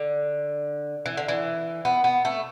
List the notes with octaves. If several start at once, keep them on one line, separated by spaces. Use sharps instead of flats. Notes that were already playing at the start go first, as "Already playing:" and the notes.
Already playing: D3
E3
D3
E3
B3
B3
A3